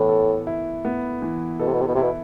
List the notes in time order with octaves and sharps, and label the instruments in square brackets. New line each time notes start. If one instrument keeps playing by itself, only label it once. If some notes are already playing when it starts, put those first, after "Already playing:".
Already playing: [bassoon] A2 [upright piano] E3 B3
[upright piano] A4
E4
B3
E3
[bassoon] B2 [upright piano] A4
[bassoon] C3
B2
C3
B2
C3
[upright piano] E4
[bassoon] B2